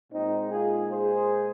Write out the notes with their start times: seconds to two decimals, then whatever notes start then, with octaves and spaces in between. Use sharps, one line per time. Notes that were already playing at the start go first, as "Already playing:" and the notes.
0.12 A#2 G#3 C4 D#4
0.51 F4 G#4
0.89 G#4 C5